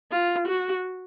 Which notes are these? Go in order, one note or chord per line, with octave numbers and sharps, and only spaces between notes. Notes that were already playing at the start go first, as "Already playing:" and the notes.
F4
F#4